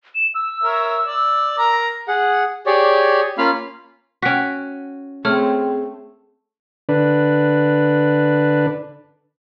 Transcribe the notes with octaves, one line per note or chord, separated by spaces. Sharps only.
E7
E6
A#4 C#5 E5
D5
A#4 A#5
G#4 F#5
G4 G#4 C#5 D5
A#3 C#4 F4 F5 B5 F6
C#4 F#4 G5 B6
A3 C4 G#4 C#5 F6
D3 D4 B4